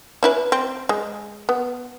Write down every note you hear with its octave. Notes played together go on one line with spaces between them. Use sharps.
C#4 E4 B4
C4
G#3
B3